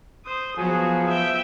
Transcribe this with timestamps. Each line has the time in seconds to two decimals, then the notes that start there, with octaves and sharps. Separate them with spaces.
0.25 C5 D#6
0.58 F3 F#3 B3 F#4 G#4
1.08 E5 G5